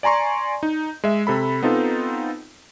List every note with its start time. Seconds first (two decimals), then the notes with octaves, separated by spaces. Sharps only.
0.03 D5 G#5 A#5 C6 C#6
0.63 D#4
1.04 G#3 E5
1.27 C3 A4 B5
1.63 B3 C4 D#4 F4 A4